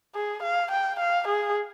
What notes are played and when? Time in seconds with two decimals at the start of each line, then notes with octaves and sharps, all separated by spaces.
0.15 G#4
0.43 F5
0.71 G5
1.00 F5
1.28 G#4